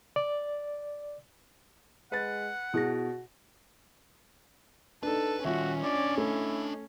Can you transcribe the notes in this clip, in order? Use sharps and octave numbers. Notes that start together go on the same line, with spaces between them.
D5
G#3 B4 F#5 A6
B2 E4 F#4 G#4 A#6
D4 D#4 A4 B4
D#3 G3 C#4 F4 F#4 E5
D4 D5 D#5
A3 E4